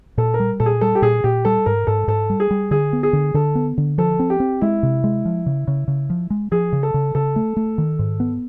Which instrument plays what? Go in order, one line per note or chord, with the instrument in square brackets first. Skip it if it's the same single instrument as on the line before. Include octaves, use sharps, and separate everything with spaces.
[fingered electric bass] A#2 [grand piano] A4
[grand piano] A#4
[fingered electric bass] G3
[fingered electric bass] A#2 [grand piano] A4
[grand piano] G#4
[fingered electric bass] G3 [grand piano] A4
[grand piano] G4
[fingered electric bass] A#2 [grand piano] G#4
[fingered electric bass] A#2 [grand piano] G4
[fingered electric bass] G3 [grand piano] A4
[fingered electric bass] G#2 [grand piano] A#4
[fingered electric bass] G#2 [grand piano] A4
[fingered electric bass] G#2 [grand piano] A4
[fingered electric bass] G3
[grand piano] G#4
[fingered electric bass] G3
[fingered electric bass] D3 [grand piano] G#4
[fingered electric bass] B3
[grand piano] G#4
[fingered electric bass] D3
[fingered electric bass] D3 [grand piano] A4
[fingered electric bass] B3
D3
[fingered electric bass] F3 [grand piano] A4
[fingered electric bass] C4
[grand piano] G4
[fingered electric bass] C4
[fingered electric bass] G#3 [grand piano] E4
[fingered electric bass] C3
G#3
F3
C#3
C#3
C#3
F3
G#3
[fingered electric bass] F3 [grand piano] G#4
[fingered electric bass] C#3
[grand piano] A4
[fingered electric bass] C#3
[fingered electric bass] C#3 [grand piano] A4
[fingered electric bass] A3
A3
D#3
G#2
B3